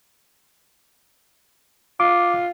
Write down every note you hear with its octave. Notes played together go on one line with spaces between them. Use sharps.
F4 D6